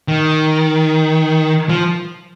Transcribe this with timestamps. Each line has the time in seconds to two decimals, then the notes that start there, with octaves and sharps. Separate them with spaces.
0.08 D#3
1.69 F3